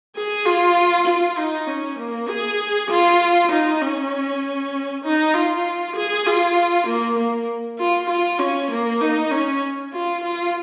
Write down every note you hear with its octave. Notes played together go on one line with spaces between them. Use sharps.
G#4
F4
F4
D#4
C#4
A#3
G#4
F4
D#4
C#4
D#4
F4
G#4
F4
A#3
A#3
F4
F4
C#4
A#3
D#4
C#4
F4
F4